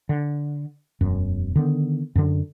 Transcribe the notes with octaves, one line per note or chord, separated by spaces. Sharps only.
D3
E1 F#2
D3 D#3 B3
F#2 D3